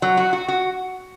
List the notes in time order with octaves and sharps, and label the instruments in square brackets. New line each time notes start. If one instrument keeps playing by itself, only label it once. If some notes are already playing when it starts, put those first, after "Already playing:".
[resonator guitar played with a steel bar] F#3 [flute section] F#5
[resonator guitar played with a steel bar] F#4
F#4
F#4